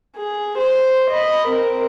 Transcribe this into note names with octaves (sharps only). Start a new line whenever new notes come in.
G#4
C5
D#5 B5
C4 A#4